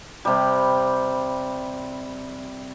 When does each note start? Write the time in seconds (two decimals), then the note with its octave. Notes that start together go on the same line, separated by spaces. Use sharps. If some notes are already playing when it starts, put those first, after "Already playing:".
0.25 C3 G3